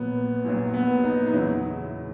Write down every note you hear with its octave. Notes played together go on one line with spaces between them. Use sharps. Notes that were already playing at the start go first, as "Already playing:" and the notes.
Already playing: A#1 A#2 F#3 B3
A#1 A#2 F#3
B3
D#4
D#4
E2 C#3 F#3 E4